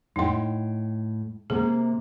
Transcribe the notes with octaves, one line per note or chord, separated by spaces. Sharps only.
A2 D#4 D#5 G5 C6
C3 A#3 G#4